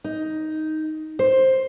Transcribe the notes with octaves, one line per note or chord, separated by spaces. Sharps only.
D#4
C5